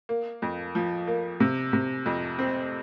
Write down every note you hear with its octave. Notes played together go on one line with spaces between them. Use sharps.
A#3
F2
F3
A#3
C3
C3
F2
C4